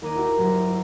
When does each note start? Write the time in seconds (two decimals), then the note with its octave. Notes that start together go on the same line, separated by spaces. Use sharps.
0.02 D#2 A#5 D6 G#6 D#7
0.15 E4 F#4 G4
0.38 G1 D2 F#3 G#6 A#6